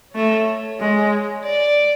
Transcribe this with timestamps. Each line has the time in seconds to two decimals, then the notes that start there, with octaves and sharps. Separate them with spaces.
0.15 A3 C#5
0.80 G#3
1.44 D5